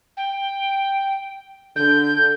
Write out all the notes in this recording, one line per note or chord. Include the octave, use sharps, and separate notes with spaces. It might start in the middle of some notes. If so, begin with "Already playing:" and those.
G5
D3 G6